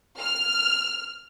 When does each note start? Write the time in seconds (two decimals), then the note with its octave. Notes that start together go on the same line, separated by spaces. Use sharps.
0.20 F6